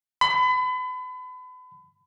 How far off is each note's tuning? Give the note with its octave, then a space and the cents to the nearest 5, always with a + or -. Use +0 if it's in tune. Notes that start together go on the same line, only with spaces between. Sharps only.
B5 +35